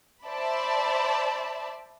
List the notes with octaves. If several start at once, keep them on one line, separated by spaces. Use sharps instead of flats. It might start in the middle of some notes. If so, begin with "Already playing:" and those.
C5 D5 E5 A5 B5